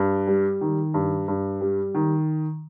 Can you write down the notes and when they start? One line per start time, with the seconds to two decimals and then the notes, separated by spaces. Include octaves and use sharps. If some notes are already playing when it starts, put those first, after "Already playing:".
Already playing: G2
0.27 G3
0.61 D#3
0.94 G2
1.28 G2
1.61 G3
1.95 D#3